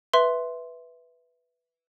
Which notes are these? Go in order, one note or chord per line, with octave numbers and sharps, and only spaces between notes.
B4 E5 C6